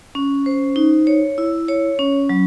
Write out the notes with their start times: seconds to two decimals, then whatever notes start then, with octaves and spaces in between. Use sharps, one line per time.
0.15 C#4
0.46 C5
0.76 D#4
1.07 C#5
1.38 E4
1.68 C#5
1.99 C#4
2.29 F#3